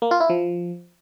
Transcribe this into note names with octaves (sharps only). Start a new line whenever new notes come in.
A#3
F4
E4
F3